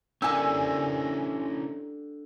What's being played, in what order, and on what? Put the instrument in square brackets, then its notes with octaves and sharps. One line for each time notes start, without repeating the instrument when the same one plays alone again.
[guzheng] D3 G4 [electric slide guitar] C#4 E4 A#4 [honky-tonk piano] G#5 E6